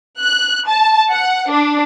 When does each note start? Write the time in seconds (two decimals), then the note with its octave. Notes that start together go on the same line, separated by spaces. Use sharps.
0.20 F#6
0.67 A5
1.10 F#5
1.49 D4